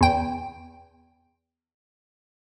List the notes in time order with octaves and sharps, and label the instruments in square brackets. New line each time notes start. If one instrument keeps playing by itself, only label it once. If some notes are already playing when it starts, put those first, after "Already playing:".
[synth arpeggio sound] E2 G5